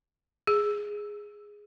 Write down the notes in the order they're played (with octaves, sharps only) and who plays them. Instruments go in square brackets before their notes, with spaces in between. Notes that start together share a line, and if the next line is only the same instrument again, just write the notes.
[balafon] G#4